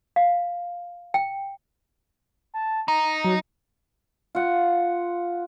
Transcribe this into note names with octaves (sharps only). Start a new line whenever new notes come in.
F5
G5
A5
D#4 A#5
F#3
F4 F#5